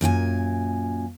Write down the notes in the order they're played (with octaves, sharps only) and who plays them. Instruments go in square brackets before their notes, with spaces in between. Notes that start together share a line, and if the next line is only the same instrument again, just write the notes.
[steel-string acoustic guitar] F#2 A#2 F#4 G#5